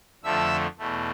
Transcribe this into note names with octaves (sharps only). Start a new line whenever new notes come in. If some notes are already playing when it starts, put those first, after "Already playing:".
F2 D3 F3 A3 E5 E6
E2 B2 A3